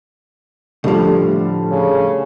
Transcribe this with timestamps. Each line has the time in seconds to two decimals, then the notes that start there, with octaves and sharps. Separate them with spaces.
0.84 A2 D3 F3 G3 A3
1.71 C#3